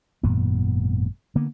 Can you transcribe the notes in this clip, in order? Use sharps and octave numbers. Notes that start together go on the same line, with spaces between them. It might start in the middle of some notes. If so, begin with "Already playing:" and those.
G#1 F#2 A#2 B3
D3 A#3 B3